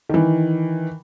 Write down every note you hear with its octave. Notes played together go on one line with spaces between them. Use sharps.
D#3 E3